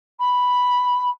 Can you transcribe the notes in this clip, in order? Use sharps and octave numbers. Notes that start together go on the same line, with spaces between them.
B5